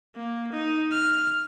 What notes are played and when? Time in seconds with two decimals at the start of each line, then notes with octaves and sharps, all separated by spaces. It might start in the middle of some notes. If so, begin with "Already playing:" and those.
0.16 A#3
0.52 D#4
0.92 F6